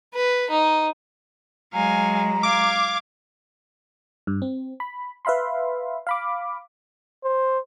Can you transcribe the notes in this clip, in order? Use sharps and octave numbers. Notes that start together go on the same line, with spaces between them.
B4
D#4
F#3 G#3 F5 G#5 A#5
F5 D6 G#6
G2
C4
B5
B4 E5 F5 B5 C6
F5 B5 D6
C5